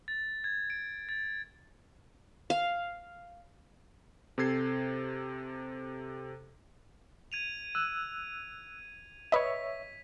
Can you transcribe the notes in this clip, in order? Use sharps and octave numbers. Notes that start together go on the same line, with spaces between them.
A6
G#6
D7
A6
F5
C3 C4 A4 G#6 C7
G#6 D#7 F7
E6 F#6
B4 C#5 D#5 E5 B6